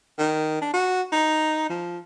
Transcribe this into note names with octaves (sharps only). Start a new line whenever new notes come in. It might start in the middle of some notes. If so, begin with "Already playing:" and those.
D#3
D4
F#4
D#4
F3